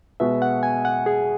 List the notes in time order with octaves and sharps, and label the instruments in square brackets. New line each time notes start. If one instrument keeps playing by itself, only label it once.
[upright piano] B2 G#3 B3 F#4 B4 [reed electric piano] E5
[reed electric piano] F#5
G#5
F#5
G#4